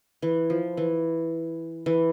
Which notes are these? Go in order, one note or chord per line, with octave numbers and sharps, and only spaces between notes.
E3
F3
E3
E3